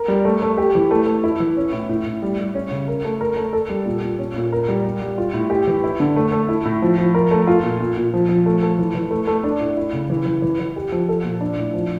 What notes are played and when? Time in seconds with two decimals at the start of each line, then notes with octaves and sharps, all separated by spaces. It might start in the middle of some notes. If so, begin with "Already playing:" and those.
Already playing: A#4
0.08 G3
0.25 A3
0.42 A3
0.57 G4
0.75 E3
0.91 A3
1.07 A3
1.24 E4
1.40 E3
1.57 C#4
1.72 A2
1.89 A2
2.06 A2
2.22 G3
2.39 G3
2.54 C#4
2.71 C#3
2.88 A#4
3.05 A3
3.21 A#4
3.37 A3
3.53 A4
3.70 G3
3.86 A#2
4.03 A#2
4.18 C#4
4.36 A#2
4.52 A#4
4.68 G3
4.85 G3
5.02 G3
5.18 F4
5.34 A2
5.50 G4
5.67 E3
5.84 E4
6.00 D3
6.16 A3
6.32 A3
6.49 E4
6.65 A2
6.82 F3
6.98 F3
7.14 A#4
7.31 A3
7.47 F4
7.64 A#2
7.80 A#2
7.97 A#2
8.14 F3
8.29 F3
8.46 A3
8.63 A3
8.79 E3
8.95 E3
9.11 A3
9.27 A3
9.44 D4
9.60 A2
9.77 E4
9.93 C#3
10.10 E3
10.26 E3
10.42 E3
10.59 E3
10.76 G4
10.92 F3
11.09 A4
11.24 A#2
11.41 D4
11.57 A2
11.74 F3